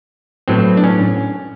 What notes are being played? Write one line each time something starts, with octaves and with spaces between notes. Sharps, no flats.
A2 F#3 B3 C4
D4
C#4